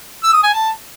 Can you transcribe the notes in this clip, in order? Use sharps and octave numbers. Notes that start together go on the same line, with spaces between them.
E6
D#6
G#5
A5